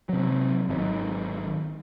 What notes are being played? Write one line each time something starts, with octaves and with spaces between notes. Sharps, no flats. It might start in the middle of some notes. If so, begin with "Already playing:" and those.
C3 F#3
G#1 D#3 F#3